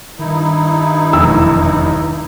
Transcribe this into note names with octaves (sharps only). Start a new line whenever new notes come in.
G2 D#3 D#4 E4
F1 B1 E2 E6